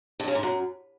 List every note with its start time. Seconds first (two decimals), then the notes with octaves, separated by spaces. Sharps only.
0.20 G2
0.27 C#3
0.35 G#2
0.43 F#2